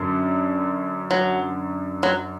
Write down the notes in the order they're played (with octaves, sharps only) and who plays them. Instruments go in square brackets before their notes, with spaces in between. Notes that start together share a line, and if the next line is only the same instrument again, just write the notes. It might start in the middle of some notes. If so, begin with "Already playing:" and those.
Already playing: [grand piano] F#2 D3 C#4
[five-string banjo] F#3
F#3